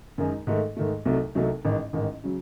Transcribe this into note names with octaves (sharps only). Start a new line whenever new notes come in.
F#2 D#3 G#3 D#4
G#2 D#3 A3
G#2 D#3 A3
C2 C3 F#3 A3 D#4
C2 C3 F#3 A3 D#4
A1 G#2 D#3
A1 G#2 D#3
C#3 F#3